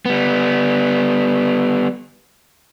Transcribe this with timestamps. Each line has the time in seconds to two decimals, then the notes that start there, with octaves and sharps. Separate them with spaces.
0.05 G3 B3